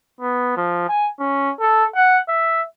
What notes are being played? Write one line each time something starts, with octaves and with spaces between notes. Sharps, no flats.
B3
F3
G#5
C#4
A4
F#5
E5